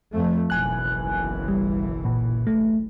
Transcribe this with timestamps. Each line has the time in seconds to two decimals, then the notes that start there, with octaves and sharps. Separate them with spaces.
0.12 F2 A3
0.50 F#1 B1 E3 G#5 F#6
1.48 G3
2.05 A#2
2.47 A3